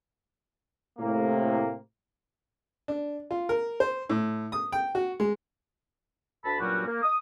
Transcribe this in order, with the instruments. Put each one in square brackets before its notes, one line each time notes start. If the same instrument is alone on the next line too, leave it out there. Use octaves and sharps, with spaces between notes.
[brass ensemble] A2 C3 A#3
[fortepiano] D4
F4
A#4
C5
A2
D#6
G5
F#4
G#3
[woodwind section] D2 A5 B5
G2 A#2 F#3 G3 C#4 F#4
A#3
D#6